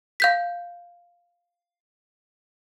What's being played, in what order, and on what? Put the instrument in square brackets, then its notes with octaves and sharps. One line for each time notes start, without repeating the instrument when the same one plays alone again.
[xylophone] F5 G6 B6